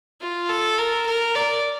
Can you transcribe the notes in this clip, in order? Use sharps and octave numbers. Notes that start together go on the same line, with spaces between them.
F4
A4
A#4
A#4
D5